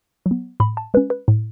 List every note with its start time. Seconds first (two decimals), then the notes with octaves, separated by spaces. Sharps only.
0.26 F#3
0.31 B3
0.60 A2 B5
0.77 A5
0.94 G#3 C#4 B4
1.10 B4
1.28 A2